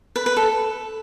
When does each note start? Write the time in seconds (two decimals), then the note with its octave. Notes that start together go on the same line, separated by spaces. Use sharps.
0.16 B4
0.26 B4
0.37 A4